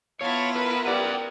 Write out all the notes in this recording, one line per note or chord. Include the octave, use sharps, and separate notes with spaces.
B3 E4 F4 C#5 F5 A5
A#4 B4
G4 B4 D5 F#5